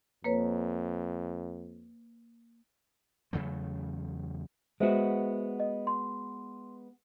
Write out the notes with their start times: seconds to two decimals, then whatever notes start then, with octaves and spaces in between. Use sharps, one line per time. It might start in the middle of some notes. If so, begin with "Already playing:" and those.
0.24 F2 A#3 B4 C#5
3.33 E2 C#3 F#3 A3
4.80 G#3 B3 F#4 C5 E5
5.60 D#5
5.87 C6